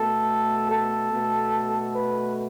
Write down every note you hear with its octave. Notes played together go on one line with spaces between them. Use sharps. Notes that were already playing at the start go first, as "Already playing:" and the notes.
Already playing: B2 A3 A4
A4
B2 A3
B4